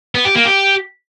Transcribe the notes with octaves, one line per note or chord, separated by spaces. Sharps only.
B3
G4
A#3
G4